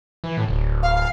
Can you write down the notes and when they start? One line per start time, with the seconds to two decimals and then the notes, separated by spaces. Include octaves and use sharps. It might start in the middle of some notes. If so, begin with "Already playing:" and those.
0.24 E3
0.37 A2
0.48 D1
0.83 F5
0.95 F5